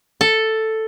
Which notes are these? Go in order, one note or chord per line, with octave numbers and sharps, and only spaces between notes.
A4